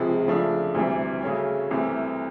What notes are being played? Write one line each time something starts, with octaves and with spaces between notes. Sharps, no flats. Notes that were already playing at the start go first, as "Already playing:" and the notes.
Already playing: C#2 C3 F3 G#3
C#3 F3 A3 D4
D2 C3 E3 G3
C#3 F#3 A3 C#4
C2 C3 E3 A3